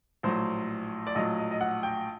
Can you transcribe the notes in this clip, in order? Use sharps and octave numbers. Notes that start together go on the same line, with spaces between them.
A#1 A2 F#3 C5
D5
A#1 A2 F#3 D#5
D#5
D#5
F#5
G5